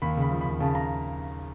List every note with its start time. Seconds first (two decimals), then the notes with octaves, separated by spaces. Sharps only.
0.02 D#2 B5
0.17 C#3 B5
0.31 F3
0.41 D#2 B5
0.60 C#3 A5
0.75 A#5